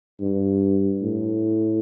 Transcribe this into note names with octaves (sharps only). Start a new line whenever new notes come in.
G2
A2